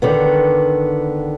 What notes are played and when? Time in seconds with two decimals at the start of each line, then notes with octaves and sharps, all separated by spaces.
0.02 D3 D#3 B3